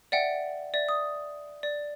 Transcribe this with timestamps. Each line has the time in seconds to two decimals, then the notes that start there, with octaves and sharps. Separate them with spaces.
0.12 D5 E5 F#5 G5
0.74 D5 E5
0.89 D#6
1.63 D5